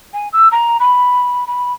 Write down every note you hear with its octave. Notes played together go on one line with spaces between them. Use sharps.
G#5
E6
A#5
B5
B5